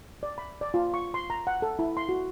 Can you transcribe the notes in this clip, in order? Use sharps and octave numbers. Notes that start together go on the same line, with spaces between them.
D5
B5
D5
F4
C#6
C6
A#5
F#5
A4
E4
C6
F#4